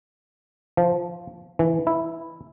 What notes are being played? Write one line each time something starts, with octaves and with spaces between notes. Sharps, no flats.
F3
E3
E4